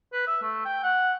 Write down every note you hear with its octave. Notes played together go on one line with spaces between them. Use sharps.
B4
E5
A3
G5
F#5